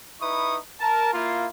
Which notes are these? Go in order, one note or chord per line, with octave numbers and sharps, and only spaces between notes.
D#4 E4 B4 C#6 D#6
A#4 A5
A#3 E4 F4